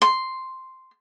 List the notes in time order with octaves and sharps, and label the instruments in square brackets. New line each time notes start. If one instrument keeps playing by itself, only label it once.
[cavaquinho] C6